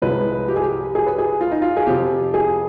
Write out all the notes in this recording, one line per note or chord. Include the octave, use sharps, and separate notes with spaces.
C2 C3 F3 G#3 B4
G4
G#4
G4
G#4
B4
G#4
F4
D#4
F4
G#4
F2 C3 F3 G4
G#4